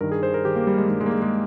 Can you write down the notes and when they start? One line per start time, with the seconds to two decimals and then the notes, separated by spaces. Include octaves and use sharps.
0.01 G2 D#3 A#4
0.12 G#4
0.23 C5
0.34 A#4
0.45 G2 D#3 G4
0.56 A#3
0.67 G3
0.78 G#3
0.89 G2 D#3 G3
1.00 G#3
1.06 A#3
1.11 G#3
1.22 G#3